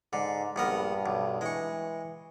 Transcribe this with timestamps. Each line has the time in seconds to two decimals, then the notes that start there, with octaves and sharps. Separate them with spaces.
0.13 G#2 D3
0.56 A#1 G2 B3 A#4
1.06 B1
1.41 E3 G#3 C#6